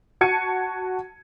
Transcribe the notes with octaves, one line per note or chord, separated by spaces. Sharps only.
F#4 A5 G#6 C#7 D#7